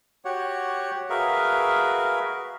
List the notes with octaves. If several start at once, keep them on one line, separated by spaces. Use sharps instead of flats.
F#4 G4 C#5 F#5
F#4 G#4 A#4 B4 E5 F5